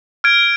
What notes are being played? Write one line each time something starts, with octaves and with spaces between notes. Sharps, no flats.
F6 G#6 D7